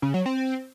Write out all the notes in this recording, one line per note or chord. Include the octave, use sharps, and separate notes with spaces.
C#3
F#3
C4